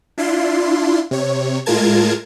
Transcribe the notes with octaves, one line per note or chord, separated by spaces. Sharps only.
D4 E4 F4 C6
C3 C#5
A2 G#3 F4 A#4 A5 G#6